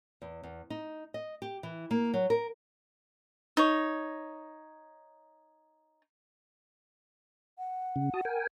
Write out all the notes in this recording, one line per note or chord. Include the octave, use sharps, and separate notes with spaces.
E2
E2
D#4
D#5
G4
E3
A#3
F#3
A#4
D#4 C#5
F#5
C#3
F#4 A5 D#6
A#4 G5 G#5